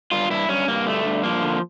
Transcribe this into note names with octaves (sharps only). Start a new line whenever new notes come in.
G2 F4
G2 E4
G2 C#4
G2 A#3
D3 A3
G2
F3 A#3
D3